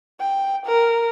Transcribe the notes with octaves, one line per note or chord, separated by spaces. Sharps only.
G5
A#4